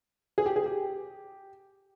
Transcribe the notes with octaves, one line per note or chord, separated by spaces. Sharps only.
G#4
G4
G#4
G4